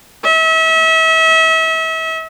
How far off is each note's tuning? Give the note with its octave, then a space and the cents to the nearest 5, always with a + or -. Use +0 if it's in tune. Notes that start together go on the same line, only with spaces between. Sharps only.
E5 -35